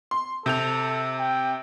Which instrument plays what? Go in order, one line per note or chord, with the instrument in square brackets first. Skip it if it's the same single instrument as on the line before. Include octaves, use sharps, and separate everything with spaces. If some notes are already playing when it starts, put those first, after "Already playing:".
[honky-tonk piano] C6
[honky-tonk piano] C3 G6 F7 [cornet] A4
[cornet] G5